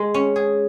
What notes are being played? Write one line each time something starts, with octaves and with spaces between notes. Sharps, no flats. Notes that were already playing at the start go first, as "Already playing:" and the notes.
Already playing: G#3
C#4
G#4